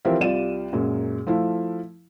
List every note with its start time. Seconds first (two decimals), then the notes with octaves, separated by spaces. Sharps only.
0.05 E3 F3 C4 G4 A#4 E5
0.21 C2 G3 F4 D5 D#7 E7
0.73 F#2 A#2 G#3
1.27 F3 A3 E4 F5